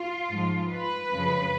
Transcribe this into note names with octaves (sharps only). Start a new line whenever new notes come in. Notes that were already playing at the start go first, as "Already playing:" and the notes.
Already playing: F4
G#2 F3 G#3
B4
F#2 C#3 F3 G#3